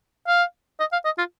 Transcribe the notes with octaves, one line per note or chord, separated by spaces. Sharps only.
F5
D#5
F5
D#5
F4